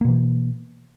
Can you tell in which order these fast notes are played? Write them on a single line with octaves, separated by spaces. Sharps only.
A#3 B2 E3